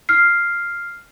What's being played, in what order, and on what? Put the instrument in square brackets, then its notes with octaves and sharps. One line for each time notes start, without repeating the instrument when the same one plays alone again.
[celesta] F6 C7